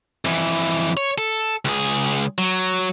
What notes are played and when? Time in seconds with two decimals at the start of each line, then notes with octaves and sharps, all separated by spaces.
0.25 F2 E3
0.97 C#5
1.18 A4
1.65 C#2 G#4
2.38 F#3